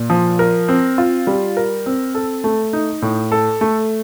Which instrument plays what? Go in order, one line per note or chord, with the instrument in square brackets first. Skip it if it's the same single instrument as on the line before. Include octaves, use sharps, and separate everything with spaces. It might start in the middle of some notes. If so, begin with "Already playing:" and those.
Already playing: [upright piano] A#2
F3
A#4
C4
F4
G3
A#4
C4
A4
A3
D#4
A2
A4
A3